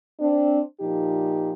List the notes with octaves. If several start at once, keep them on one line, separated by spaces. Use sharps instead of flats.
C4 D4
A#2 F3 D#4 G4